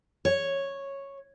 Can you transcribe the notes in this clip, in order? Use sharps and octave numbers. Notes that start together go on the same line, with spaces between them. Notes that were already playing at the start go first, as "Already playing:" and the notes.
C#5